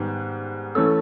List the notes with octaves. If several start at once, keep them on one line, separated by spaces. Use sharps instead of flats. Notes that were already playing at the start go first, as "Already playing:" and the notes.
Already playing: G#2 D#3 G3 B3
E3 A3 C#4 A4